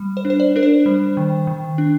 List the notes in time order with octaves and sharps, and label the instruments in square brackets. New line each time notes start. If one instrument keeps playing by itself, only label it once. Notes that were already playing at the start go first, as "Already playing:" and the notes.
Already playing: [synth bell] G3
C5
D4
C5
D5
D4 A#4
C5
G3
D#3
D#3
D4